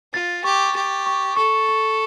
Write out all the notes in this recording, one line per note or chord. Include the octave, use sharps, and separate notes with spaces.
F4 A6
G4 C#6
G4 A6
C#6
A4 C#6
C#6